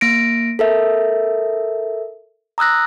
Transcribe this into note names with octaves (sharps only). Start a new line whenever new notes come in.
A#3 A#6 D7
A4 A#4 E5
A#5 D#6 E6 F#6 A#6